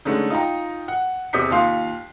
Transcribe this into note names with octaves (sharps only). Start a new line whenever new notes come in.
D3 G#3 A3 C#4 D#4
D#4 F4 G5 A#5
F#5
E2 C3 D#6 G6 B6 C#7
D#2 F4 F5 C6 C7